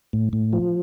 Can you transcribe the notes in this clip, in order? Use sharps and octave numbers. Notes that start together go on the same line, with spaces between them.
A2
A2
F3